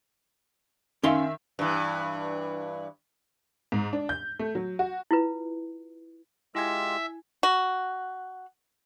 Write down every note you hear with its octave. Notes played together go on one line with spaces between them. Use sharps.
D#3 C#4 E5 F5 C6
G2 E3
G#2
D4
G6
A3
F#3
F#4
E4 F4 B4
G#3 E4 F4 G4 E5 G#5 G#6
F#4